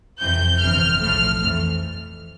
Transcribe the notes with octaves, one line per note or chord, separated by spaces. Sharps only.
F2 C3 E3 G6
G1 F2 C3 E3 F6
B1 A2 F3 A3 F6
F2 E3 A3